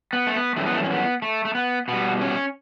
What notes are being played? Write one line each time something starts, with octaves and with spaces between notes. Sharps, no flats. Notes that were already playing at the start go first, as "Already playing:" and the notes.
B3
A3
B3
F#2 E3 G3 A3
B3
A3
C#4
B3
A3
A3
B3
B2 G3 B3
C#4